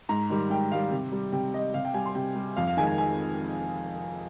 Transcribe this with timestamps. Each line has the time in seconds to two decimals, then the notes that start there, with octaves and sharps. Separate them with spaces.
0.09 G#2 A#5
0.30 D#3 G3
0.50 G#2 G5
0.72 D#3 G3 F5
0.91 C3
1.12 G3
1.32 C3 G5
1.54 G3 D#5
1.74 C3 F5
1.85 G5
1.94 G3 G#5
2.06 C6
2.15 C3 G5
2.35 G3
2.56 F2 F5
2.67 F5
2.77 D#3 G#3 G#5
2.87 G#5
2.98 G#5